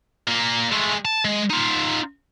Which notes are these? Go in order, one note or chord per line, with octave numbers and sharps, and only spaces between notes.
A#2 A#3
G#3 A3
A5
G#3
D#4 F4